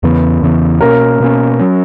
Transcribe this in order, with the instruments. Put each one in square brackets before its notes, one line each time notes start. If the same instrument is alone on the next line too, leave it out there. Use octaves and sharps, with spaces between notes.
[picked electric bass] E2 C#3 E3 B3
E2 C#3 E3 B3
[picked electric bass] B2 A#3 C#4 [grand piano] A#4
[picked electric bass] B2 A#3 C#4
F#3 C#4